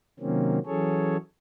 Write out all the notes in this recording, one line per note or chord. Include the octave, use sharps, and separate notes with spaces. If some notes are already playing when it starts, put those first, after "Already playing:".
C3 D#3 F#3 A#3 C4 C#4
E3 F#3 C#4 G#4 A4 C#5